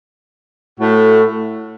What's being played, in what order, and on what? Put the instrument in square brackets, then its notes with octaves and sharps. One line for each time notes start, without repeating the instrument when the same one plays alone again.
[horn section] A2 A3 F#4